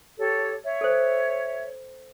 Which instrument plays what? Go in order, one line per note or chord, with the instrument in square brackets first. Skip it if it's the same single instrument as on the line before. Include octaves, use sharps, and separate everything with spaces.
[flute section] G4 A4 C#5
C#5 E5
[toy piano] A4 C5